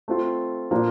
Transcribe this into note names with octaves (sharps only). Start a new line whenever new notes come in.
A3 C4 F4
A#2 F3 A#3 D4 F4